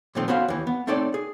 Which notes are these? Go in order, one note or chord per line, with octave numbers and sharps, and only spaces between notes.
A#2 D#3 F3 A3 C4
B3 C#4 F#4 C5 F5
D#2 E3
B3
A3 C4 D#4 A4 C#5 D5
G#4